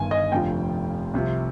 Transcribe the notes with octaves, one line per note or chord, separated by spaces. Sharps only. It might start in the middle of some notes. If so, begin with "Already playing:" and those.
Already playing: G1 G2 D#3 G#5
D#5
F1 F2 D3 F3 G5
C2 C3 F3